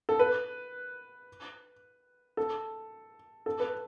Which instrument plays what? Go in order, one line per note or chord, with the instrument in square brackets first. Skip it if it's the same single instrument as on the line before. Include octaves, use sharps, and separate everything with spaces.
[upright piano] A4
B4
A4
A4
B4